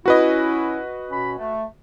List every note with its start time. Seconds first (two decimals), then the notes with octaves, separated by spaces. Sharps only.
0.06 C#4 E4 F#4 B4 D#5
1.10 B2 C#4 B5
1.37 A3